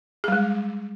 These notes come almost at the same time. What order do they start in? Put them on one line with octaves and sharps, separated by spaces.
G#4 G3 G#3